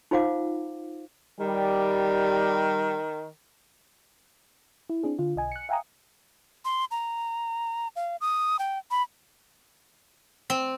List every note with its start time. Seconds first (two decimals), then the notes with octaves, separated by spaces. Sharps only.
0.11 D#4 F4 C5 F5 F#5 D6
1.40 D#3 G3
4.90 E4
5.03 C4 D4 G#4
5.19 D3 F4
5.36 B1 D#5 G#5
5.52 F#6 C#7
5.69 E5 F5 G5 G#5 A#5 D#6
6.65 C6
6.91 A#5
7.96 F5
8.21 D#6
8.59 G5
8.91 B5
10.50 C4